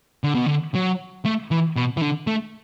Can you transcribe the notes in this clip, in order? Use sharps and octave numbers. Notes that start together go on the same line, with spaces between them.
D3
B2
D3
F#3
A3
E3
B2
E3
D3
A3